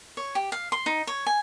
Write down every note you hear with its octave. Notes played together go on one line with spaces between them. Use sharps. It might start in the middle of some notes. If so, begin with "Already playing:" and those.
C#5
G4
F5
C6
D#4
C#5
G#5